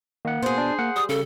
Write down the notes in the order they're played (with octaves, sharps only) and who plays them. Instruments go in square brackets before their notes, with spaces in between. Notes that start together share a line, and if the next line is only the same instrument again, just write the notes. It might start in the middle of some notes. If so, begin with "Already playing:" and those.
[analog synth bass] D#3 [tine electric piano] A#3 F#5
[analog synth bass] B2 [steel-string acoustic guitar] G#4 C5
[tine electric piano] D4
[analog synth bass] A#3 [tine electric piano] F#5
[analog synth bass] G3 [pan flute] D#6
[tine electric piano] C#3 [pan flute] A4